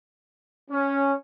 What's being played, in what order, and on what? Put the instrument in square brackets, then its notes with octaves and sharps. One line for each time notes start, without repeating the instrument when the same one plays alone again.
[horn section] C#4